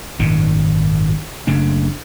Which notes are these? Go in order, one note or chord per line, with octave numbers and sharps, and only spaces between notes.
G#1 F#2 A#2 D#3
F#1 C#3 A3 D4